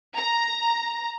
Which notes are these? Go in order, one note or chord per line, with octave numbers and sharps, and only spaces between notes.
A#5